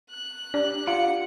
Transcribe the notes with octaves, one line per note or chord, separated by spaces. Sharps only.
F#6
D4 G4 D5
F4 F5 F#5 C#7